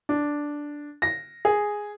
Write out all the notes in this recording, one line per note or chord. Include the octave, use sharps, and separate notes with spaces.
D4
A#6
G#4